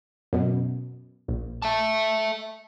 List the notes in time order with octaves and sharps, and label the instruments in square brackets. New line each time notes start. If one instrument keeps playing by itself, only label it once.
[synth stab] F#2 B2
A#1
[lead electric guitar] E5 A5